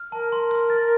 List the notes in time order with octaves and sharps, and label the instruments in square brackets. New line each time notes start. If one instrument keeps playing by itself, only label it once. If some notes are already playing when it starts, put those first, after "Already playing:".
Already playing: [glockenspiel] F6
[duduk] A#4 [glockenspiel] A5
[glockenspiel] C6
F6
A6